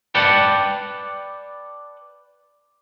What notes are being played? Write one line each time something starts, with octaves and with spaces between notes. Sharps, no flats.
B4 D5 F#5 G5 A5